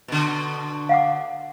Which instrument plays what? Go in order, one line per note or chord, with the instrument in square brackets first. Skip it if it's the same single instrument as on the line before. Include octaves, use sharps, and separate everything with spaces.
[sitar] B2 D3
[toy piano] F5 F#5 D6